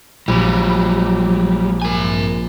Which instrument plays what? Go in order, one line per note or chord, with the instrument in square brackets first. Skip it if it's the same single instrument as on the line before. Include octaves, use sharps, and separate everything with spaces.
[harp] A#1 [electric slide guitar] F#3 G3
[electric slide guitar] A#4 G#5